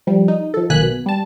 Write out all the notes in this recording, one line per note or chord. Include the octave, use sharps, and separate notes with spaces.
F3 G3
D#4
F3 A4
B1 D#3 A#3 G#5 F#6 B6
B2
G3 A5